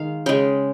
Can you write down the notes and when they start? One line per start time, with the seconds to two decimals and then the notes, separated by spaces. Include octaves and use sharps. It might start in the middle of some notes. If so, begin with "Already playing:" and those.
Already playing: D#3 G#3 F5
0.26 C#3 G#3 G5